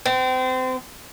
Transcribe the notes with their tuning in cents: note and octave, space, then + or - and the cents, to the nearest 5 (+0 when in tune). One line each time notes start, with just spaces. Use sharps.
C4 -30